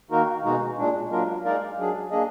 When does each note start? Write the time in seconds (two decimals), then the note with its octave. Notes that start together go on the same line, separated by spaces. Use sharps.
0.11 D#3 A#3 D#4 F#4 A#4
0.44 B2 G#3 D#4 F#4
0.77 A#2 G#3 D4
1.10 F#3 A#3 D4 F4 A#4
1.45 G#3 D#4 A#4 D5 F5
1.78 F#3 D4 G#4
2.11 A#3 D4 G#4 D#5